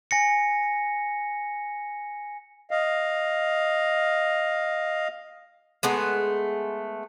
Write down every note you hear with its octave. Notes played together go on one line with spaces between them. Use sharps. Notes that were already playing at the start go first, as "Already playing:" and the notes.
G#5 A#6 C#7
D#5 F5
G#3 A3 B3